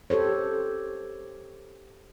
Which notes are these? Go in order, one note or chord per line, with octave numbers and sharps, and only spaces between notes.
G4 A4 C5 C#5